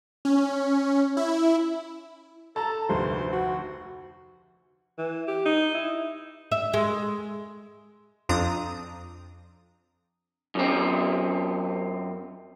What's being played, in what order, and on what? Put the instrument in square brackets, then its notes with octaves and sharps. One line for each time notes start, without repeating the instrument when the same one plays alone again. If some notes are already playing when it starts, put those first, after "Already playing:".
[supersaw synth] C#4
E4
[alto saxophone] A4 [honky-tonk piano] A5 A#5
[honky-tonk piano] F1 D2 [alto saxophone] C5
[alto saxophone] F#4
E3
G4
D#4
E4
[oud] E5
G#3
[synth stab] F2 F3 C4 D4 A#5 D#6
[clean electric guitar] F#2 C4